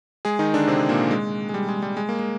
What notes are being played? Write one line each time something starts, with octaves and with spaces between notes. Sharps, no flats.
G#3 G#4
D#3 D#4
D3 D4
C3 C4
A#2 A#3
G#3
G#3
G3
G#3
G3
G#3
A#3
G#3